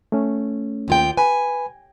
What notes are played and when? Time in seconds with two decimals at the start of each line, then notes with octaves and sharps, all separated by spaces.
0.12 A3 C#4
0.88 D#2 F4 G5
1.17 B4 G#5 B5